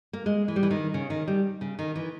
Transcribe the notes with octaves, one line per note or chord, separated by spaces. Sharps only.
A#3
G#3
E3
G3
E3
D#3
C#3
D#3
G3
C#3
D#3
E3